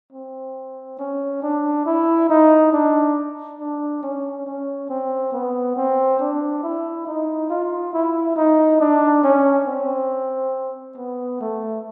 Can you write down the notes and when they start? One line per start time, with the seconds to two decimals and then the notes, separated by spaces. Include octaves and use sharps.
0.13 C4
0.99 C#4
1.43 D4
1.86 E4
2.30 D#4
2.72 D4
3.59 D4
4.03 C#4
4.46 C#4
4.90 C4
5.33 B3
5.76 C4
6.20 D4
6.63 E4
7.07 D#4
7.50 F4
7.93 E4
8.36 D#4
8.81 D4
9.24 C#4
9.66 C4
10.97 B3
11.41 A3